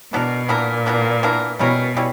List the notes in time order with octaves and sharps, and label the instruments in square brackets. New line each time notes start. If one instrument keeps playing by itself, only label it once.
[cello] B2 [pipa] E3 B3 D4 A#4
[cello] A#2 [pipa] E3 B3 D4 A#4
[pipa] E3 B3 D4 A#4
E3 B3 D4 A#4
[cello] B2 [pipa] G3 C#4 E4 A#4
[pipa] G3 C#4 E4